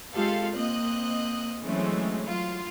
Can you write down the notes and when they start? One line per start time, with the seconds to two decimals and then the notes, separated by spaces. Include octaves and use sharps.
0.14 G#3 C4 F4 G4 A4 F5
0.53 A#3 C4 D#5 F#6
1.62 E3 F#3 G#3 A3 C4 C#4
2.22 F#3 F4